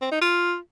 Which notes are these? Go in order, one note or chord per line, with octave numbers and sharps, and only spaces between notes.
C4
D#4
F4